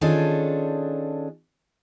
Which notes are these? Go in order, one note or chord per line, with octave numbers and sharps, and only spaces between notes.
D#3 C#4 D4 F4 G#4 A4